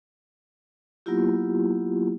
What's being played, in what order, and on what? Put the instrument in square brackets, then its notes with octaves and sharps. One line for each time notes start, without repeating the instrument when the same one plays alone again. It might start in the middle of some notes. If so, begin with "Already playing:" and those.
[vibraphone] F#3 A#3 B3 E4 F4 G4